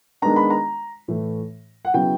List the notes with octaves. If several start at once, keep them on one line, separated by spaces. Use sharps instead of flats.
D#3 G#3 B3 D4 A#5
B5
A#5
A2 E3 A3
F#5
C#3 F#3 B3 E4 G5